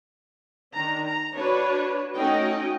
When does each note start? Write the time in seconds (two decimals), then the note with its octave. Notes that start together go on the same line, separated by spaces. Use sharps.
0.74 D#3 D4 A#5
1.06 A#5
1.36 D4 F#4 B4 C#5
2.17 A3 C#4 D#4 F#4 D#5 G5